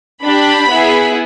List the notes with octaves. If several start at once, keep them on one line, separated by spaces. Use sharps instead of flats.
D4 G4 B5
B3 E4 G#4